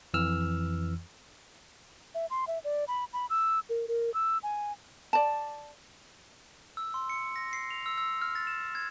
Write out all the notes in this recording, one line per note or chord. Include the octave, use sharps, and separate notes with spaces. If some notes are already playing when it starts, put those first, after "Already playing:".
F2 E3 E6 F6
E5
C6
E5
D5
B5
B5
E6
A#4
A#4
E6
G#5
D5 A5
E6
C6
C#7
A#6
C7
F7
E6
E6
F6
A6
E7
G#6